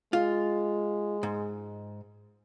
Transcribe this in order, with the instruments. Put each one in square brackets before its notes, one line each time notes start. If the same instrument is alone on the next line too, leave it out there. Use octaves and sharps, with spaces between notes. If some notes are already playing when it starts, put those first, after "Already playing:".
[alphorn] G#3 [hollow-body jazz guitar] F4
[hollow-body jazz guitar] G#2